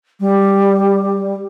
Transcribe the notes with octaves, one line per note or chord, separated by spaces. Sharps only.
G3